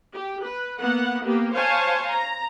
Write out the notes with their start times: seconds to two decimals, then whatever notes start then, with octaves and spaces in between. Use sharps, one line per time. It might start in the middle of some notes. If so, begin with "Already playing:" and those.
0.13 G4
0.44 B4
0.81 A#3 B3 F#5
1.23 A#3 B3 G4
1.54 C5 C#5 F5 G#5 A5
2.09 A#5